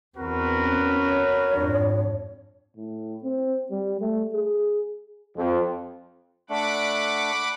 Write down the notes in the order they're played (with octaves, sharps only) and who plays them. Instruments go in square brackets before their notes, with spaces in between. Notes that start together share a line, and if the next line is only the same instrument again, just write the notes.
[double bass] E2 C4 [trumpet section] F#4 A#4 B4
[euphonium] C#4
[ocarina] C#5
[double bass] F2 G#2 [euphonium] D4
[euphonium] A2
C4
G3
A3
G#4
[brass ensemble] F2
[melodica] A3 D4 [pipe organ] F#5 B5 D6